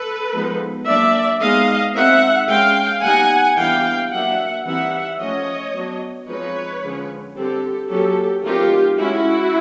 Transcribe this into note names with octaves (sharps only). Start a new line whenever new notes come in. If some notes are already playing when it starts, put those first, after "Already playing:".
Already playing: A4 B4
F3 G#3 B3 D#4
F#3 A#3 D4 D5 E5
G#3 B3 D#4 D#5 F5
G#3 C4 D#4 E5 F#5
G#3 C#4 F5 G5
G3 B3 D#4 F#5 G#5
E3 G3 B3 D4 F5 G5
F#3 A#3 D4 E5 F#5
E3 G3 C4 D#4 E5 F#5
F3 A3 C#4 C#5 D#5
F#3 B3 D4
F3 G#3 C4 D#4 B4 C#5
D3 F3 G#3 C#4
D3 G3 C4 G4 A4
F#3 A#3 C#4 G4 A4
D#3 F#3 A3 C4 D#4 F4 G4
G#3 C#4 E4 F#4